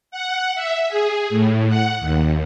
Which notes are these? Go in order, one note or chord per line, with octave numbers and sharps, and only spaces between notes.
F#5
E5
G#4
A2
F#5
D#2